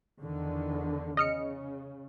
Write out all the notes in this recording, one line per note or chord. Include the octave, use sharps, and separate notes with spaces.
E2 D3 D#3
C#3 D#5 F6 C#7